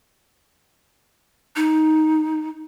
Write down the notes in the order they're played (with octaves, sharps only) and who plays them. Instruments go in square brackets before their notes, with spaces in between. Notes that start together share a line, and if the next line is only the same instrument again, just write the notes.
[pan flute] D#4